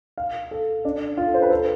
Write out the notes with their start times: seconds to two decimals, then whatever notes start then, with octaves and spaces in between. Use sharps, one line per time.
0.18 F5
0.51 A4
0.85 D4
1.17 F4
1.26 A4
1.34 C5
1.42 B4
1.51 A4